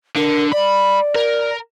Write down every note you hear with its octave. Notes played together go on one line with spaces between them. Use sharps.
D3 A#4
D5 B5
A#4